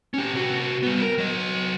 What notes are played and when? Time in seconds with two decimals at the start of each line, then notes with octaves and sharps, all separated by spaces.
0.14 C#4 G4
0.34 C3 F#4
0.83 G3 B3
1.02 A#4
1.18 F#3 D#5